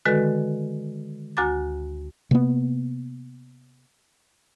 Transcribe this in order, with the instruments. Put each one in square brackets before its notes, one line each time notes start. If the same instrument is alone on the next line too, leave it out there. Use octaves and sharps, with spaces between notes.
[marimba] D3 D#3 G#3 F#4 A4 B4
D2 F#4 G#5 A#5 D6 A6
[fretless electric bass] C3 A#3 B3